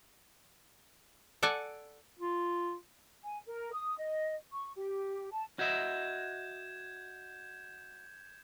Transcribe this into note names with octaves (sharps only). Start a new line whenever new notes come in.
A4 D5 F#5 G#5
F4
G#5
A#4
D#6
D#5
C#6
G4
A5
F#4 D#5 E5 G6 G#6 E7